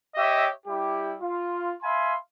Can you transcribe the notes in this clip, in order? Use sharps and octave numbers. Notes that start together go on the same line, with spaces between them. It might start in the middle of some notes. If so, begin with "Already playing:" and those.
G4 C#5 D#5 E5
G3 E4 G4
F4
E5 F5 G#5 B5 C6